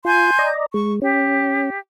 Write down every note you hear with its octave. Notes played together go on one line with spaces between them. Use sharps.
F4 G#5 C6 G6
D5 D#5 A#5
G#3 C#6
C#4 G4